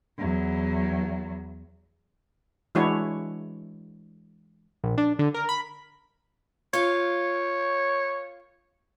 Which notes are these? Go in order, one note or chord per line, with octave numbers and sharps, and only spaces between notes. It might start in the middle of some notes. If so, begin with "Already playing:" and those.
E2 F#3
E3 G#3 D4 E4 F#4 C#5
A#1
D4
D3
A#4
B5
F4 C#5 F5